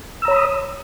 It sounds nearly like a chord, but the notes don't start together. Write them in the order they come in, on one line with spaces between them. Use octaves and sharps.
E6 A#5 C#5 B5 D#6